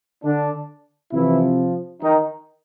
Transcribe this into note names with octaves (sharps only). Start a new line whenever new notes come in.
D3 D4
C3 E3 F3 E4
D#3 D#4